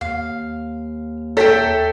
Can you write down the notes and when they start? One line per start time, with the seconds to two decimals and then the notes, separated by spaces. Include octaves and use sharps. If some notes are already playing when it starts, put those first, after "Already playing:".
0.01 D#2 F5
1.37 A4 C#5 E5 G5 A#5 B6 D7